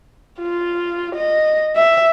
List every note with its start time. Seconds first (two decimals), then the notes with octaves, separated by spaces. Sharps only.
0.40 F4
1.15 D#5
1.76 E5